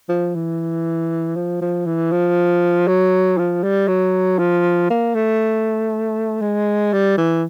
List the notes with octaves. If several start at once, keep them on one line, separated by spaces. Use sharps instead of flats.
F3
E3
F3
F3
E3
F3
F#3
F3
G3
F#3
F3
A#3
A3
G#3
G3
E3